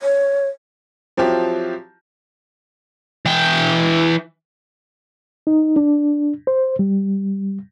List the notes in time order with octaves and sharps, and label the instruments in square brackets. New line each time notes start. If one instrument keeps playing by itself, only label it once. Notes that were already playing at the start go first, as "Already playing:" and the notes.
[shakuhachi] C#5
[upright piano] F3 F#3 C4 E4 F4 G4
[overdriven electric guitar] E3 G5
[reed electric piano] D#4
D4
C5
G3